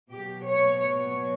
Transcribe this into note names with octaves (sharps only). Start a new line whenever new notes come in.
B2 F#3 G4
C#5
C#5